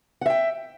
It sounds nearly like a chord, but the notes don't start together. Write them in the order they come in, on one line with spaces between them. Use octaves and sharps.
F#5 E5 G5